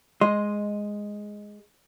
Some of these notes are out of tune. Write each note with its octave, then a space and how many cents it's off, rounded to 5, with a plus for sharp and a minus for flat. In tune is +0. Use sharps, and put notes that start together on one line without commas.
G#3 +0 D#5 +0 C6 +0